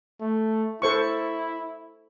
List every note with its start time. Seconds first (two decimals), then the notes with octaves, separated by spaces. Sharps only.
0.21 A3
0.82 E4 A4 C5 C#6